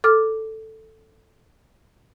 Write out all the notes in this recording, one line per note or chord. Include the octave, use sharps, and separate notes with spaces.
A4 D6 F6